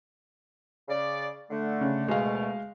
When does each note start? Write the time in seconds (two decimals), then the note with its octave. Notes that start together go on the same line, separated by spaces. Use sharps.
0.89 C#3 D5
1.50 D3 A3
1.81 C#3
2.08 D2 B2 G#3 A3 F5